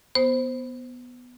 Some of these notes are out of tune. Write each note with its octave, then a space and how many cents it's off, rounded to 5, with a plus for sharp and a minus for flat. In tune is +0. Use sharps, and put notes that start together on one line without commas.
B3 +0 C5 +0